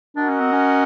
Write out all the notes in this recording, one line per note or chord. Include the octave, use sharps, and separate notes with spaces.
D4 F#4 A#4 D#5 F#5
C#4
C4
C#4